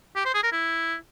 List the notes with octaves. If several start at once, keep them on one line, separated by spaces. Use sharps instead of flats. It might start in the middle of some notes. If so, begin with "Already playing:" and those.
G4
C5
G#4
A#4
E4